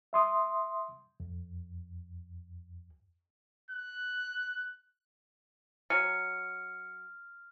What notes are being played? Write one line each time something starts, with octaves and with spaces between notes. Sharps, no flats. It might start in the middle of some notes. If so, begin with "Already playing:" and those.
E5 C6 D#6
F2
F#6
F#3 G#5 F6 C#7